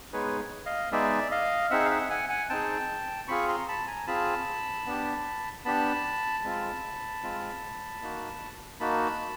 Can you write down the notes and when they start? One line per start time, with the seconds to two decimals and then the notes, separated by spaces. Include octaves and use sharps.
0.13 G#3 B3 D#4 G#4 B4 C#5
0.66 D#5 F5
0.92 G#3 B3 D#4 G#4 D5 E5
1.31 D#5 F5
1.71 C4 D#4 G#4 E5 F#5
1.85 F5
1.91 E5 F#5
2.10 F#5 G#5
2.30 F#5 G#5
2.50 C4 D#4 G#4 G5 A5
3.28 C4 F4 G#4 B5 C#6
3.48 A#5 C6
3.68 A5 B5
3.87 G#5 A#5
4.07 C4 F4 G#4 A5 B5
4.86 B3 D4 G4
5.65 B3 D4 G4 A5 B5
6.44 G#3 C4 F4
7.23 G#3 C4 F4
8.02 A#3 D#4 F#4
8.80 A#3 D#4 F#4 A5 B5